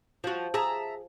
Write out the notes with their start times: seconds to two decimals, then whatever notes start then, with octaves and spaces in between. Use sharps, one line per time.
0.24 F3 F#4
0.54 G#4 E5 A5 A#5